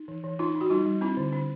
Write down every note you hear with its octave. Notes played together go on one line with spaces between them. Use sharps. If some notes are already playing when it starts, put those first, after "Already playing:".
Already playing: D#4
E3
E3
D4 D#4 F4
D4
F#4
G3 D#4 F4
G3
C4 D4 E4
D3
D3 D4